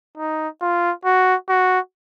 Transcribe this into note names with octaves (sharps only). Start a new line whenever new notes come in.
D#4
F4
F#4
F#4